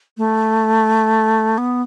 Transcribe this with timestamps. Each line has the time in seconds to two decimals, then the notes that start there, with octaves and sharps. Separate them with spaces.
0.17 A3
1.58 B3